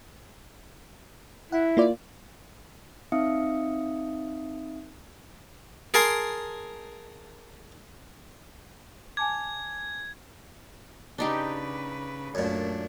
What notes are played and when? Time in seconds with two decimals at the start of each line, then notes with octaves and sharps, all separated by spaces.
1.52 E4 F#5
1.77 A#3 F4 D5
3.12 C4 D#4 E5 F5 D#6 C#7
5.94 G#4 A#4 G#5 A5 C6
9.17 G#5 A5 D6 G#6
11.18 C#3 D4 D#4 G4 B4
12.35 F#2 A#2 A3 D4